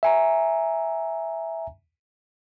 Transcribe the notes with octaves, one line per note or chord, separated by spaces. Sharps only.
E5 G#5 A#5